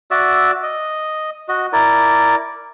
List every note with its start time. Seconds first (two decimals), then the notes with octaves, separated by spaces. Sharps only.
0.11 F#4 D5 E5 E6
0.63 D#5
1.48 F#4 D#5
1.73 E4 A#4 D5